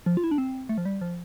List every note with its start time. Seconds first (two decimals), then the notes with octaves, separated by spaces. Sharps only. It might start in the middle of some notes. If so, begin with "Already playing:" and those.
0.06 F3
0.17 F4
0.24 E4
0.31 D4
0.38 C4
0.69 A3
0.78 F3
0.85 G3
1.01 F3